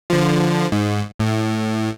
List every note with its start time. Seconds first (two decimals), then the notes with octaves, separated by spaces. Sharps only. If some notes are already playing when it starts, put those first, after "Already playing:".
0.10 D3 F3
0.72 G#2
1.19 A2